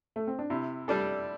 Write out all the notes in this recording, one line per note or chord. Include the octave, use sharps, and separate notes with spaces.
A3
C4
D4
C3 E4
G3 D4 A4